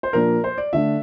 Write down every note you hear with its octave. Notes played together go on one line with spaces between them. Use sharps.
C5
A#2 F3 A#3 D4 A#4
C5
D5
D3 A3 D4 E5